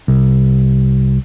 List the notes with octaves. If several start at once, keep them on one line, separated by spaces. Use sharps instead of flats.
C2